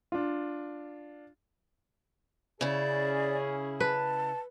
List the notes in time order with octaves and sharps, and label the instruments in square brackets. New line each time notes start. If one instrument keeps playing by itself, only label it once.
[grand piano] D4 F4
[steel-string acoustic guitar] C#3 E4 [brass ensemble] C#4 G#4 [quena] D5
[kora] B4 [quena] A5